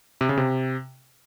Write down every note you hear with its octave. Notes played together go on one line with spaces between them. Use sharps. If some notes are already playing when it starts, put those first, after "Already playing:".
C3
C#3
C3